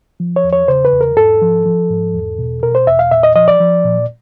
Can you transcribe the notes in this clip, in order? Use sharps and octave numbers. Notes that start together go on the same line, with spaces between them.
F3
C#5
E2
C#5
C#3 C5
B4
E2
A#4
G#2 A4
F3
F3
G#2
E2
B2
B2 A#4
C5
E2 E5
F5
A#2 E5
D#5
F3 D#5
D5
F3
A#2